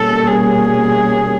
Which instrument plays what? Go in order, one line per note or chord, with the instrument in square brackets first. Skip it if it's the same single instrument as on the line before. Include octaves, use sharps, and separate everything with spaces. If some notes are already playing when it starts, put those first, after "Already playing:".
Already playing: [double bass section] B2 G3 A#3 C#4 [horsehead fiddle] A4
[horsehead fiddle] G#4